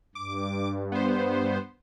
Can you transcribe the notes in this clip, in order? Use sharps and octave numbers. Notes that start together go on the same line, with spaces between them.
G2 D6
B3 C5